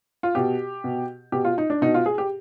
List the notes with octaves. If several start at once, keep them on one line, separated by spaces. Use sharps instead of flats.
F4
B2 G4
B2
B2 G4
F4
D#4
D4
B2 D#4
F4
G#4
G4